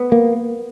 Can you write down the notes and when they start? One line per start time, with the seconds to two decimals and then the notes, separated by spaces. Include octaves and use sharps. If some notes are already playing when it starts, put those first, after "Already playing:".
Already playing: B3
0.12 A#3